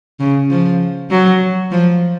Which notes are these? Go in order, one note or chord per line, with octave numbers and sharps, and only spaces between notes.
C#3
F3
F#3
F3